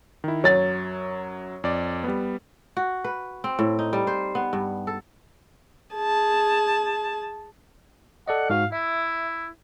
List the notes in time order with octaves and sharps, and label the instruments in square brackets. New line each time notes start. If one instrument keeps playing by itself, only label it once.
[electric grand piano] D#3 E4
[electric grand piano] F#2 F#3 [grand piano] C#5 A6
[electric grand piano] F2 D5
G3 B3
[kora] F#4
B4
C4
A2
D#4
G3
C5
B3
G2
A4
[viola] G#4 A5
[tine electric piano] A4 D5 D#5 [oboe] F#5
[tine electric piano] G#2 F#4 [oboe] F5
[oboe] E4 [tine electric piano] E5